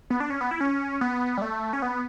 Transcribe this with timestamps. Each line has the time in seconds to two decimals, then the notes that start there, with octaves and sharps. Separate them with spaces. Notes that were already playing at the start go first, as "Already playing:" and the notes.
0.10 B3
0.20 D4
0.30 C#4
0.41 B3
0.51 E4
0.61 C#4
1.01 B3
1.38 G3
1.42 A3
1.73 C#4
1.82 B3